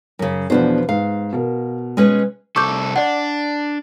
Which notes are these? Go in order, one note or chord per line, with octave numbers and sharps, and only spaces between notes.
F#2 C#3
E2 B2 F3 B3 D4 C5
G#2 F5
B2 A#4
G#3 C#4 B4
C2 A4 C#6 D6 G6
D4 D5 F#5